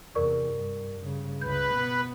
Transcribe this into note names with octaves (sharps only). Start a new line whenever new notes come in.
E2 C3 A#4 D5 C#6
G2
G2 C#3
C#2 C#3 B4 G6
B2 B3